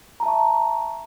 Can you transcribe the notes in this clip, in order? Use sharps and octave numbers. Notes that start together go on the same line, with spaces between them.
E5 A5 A#5 C#6